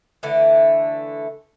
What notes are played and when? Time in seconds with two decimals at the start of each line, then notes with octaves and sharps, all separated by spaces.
0.23 D3 E3 A3